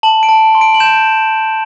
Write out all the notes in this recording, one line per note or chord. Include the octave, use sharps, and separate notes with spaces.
A5 F#7
D7
A5
C6
D7
F#7
G6 E7